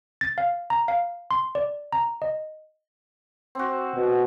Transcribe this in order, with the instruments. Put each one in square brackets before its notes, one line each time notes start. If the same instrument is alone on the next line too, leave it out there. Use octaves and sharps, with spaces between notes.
[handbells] A6
F5
A#5
F5
C6
D5
A#5
D#5
[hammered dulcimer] C4 F#4
[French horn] B2